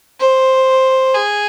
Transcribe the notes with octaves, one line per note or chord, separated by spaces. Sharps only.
C5
G#4